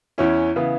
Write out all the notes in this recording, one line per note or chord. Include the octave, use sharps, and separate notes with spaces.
E2 E3 C#4 E4
C#3 E3 B3 E4